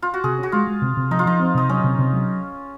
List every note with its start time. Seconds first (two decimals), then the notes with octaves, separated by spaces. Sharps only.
0.02 F4
0.14 F#4
0.24 C3 G#4
0.38 C#4 F#4
0.52 G#3 F4
0.67 G#3
0.82 C3
0.97 C3
1.11 F3 D#4
1.19 F4
1.26 F3 D#4
1.40 C4
1.55 C3 D#4
1.69 F#3 C#4
1.84 C3
1.99 C3
2.13 F#3